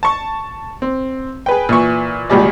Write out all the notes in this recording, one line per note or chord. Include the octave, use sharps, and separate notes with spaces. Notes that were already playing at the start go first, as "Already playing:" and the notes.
A5 C#6
C4
G#4 B4 G5
A#2 E3 C#6
G#1 C#2 A#2 G3 G#4 D5